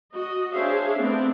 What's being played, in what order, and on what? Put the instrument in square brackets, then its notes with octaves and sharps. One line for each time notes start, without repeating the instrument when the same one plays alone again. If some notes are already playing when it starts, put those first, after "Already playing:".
[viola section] F#4 D#5
D4 G#4 C5 C#5 E5 F5
A3 B3 C4 D4